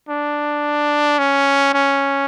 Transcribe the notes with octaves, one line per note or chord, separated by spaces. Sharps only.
D4
C#4
C#4